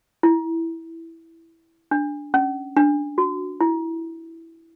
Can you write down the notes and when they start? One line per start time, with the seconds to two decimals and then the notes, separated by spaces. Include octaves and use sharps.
0.23 E4
1.91 D4
2.34 C#4
2.77 D4
3.18 F#4
3.60 E4